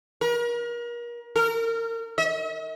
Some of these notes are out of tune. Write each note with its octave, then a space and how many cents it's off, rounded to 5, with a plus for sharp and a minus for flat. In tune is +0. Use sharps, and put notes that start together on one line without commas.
A#4 +35
A#4 -30
D#5 +45